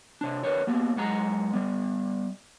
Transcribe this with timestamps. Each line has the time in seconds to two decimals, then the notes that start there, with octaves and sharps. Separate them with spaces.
0.21 C3 D4
0.43 D3 A#4 B4 C#5
0.67 A#3 B3 G4
0.96 F#2 G#3 F#5 A#5
1.53 G3 B3